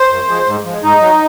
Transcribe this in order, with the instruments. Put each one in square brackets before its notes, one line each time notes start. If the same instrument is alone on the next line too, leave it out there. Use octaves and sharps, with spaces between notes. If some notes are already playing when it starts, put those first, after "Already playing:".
Already playing: [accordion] C5
F#2
F3 G#3
G#2
F3 G#3
G#2 D#4
F#3